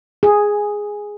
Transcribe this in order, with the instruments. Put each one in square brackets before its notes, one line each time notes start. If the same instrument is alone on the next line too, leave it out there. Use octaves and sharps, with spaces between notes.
[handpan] G#4